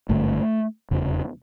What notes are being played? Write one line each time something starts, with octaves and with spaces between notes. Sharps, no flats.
G#1 G2 D3 A3
F1 E2 C#3